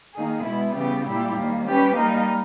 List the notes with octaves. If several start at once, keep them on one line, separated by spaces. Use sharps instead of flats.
D#3 A#3 D#4 G#4
B2 G#3 B3 E4
C#3 E3 G3 B3 G4
A#2 G3 A#3 E4 G4
D#2 D#3 G3 A#3
G3 C#4 G4 B4
G3 A#3 D#4 A#4